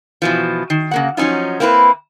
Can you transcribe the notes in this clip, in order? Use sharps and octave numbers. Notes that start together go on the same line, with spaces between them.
B2 E3 F3
D#3
C#3 A#3 F#5
F3 F#3 C#4 D#4 F4
A#3 C4 E4 F4 B4